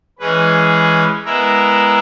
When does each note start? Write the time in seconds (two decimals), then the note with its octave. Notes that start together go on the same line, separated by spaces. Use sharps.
0.19 E3 G#3 C#4 G#4 B4
1.25 G#3 B3 E4 A#4 E5